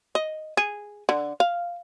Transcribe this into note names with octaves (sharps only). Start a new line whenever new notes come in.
D#5
G#4
D3
F5